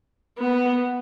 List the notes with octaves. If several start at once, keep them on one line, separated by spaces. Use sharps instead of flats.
B3